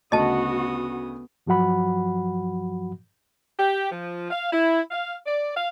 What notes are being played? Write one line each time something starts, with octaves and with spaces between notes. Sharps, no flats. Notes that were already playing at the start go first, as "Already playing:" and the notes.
D2 C#3 B3 F#4 D#5 A5 D#6
G2 F3 F#3 F#4 F#5 B5
G4
F3
F5
E4
F5
D5
F5